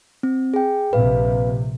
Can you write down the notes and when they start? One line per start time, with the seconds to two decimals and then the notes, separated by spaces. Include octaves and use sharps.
0.23 C4
0.54 G#4 G5
0.93 A#1 C3 B4 F5